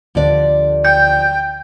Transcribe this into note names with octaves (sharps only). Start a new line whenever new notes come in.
D2 D3 F3 G3 D5
G5 G6